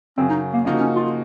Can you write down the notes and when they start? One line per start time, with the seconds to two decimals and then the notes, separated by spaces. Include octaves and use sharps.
0.17 F#2 C#3 F#3 C4
0.30 D#4
0.53 A#3
0.65 C#3 F3 A#3 D#4 F#4
0.80 C#4
0.96 F4